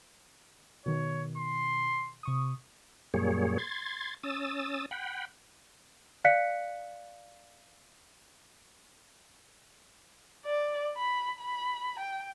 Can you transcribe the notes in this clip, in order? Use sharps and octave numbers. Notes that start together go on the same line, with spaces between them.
B2 D#3 C#5
C6
C3 C#6 D#6
F#2 A#2 G3 A#3 G#4 C#5
C6 G#6 A6
C#4 D#6 E6 A6
F#5 G5 B5
D5 F5 F#6 B6 C#7
D5
B5
B5
G5